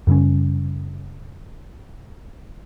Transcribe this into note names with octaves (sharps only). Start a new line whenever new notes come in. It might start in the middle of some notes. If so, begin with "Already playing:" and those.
F#2 C#3 G3 C#4